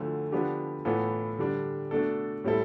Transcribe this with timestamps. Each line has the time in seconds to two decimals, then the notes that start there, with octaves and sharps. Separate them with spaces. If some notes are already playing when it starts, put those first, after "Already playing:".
Already playing: D2 D3 F3 A3
0.32 D3 F3 B3 D4 G4
0.85 A2 E3 B3 F4 A4
1.39 D3 G3 D4
1.91 B2 A3 D4 A4
2.44 A2 G3 C4 E4 A4